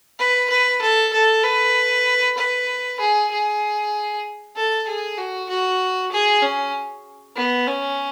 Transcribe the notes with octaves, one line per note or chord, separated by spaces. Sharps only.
B4
B4
A4
A4
B4
B4
G#4
G#4
A4
G#4
F#4
F#4
G#4
C#4
B3
C#4